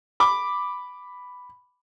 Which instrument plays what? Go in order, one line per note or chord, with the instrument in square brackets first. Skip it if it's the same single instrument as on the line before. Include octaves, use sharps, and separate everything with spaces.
[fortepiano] B5 D6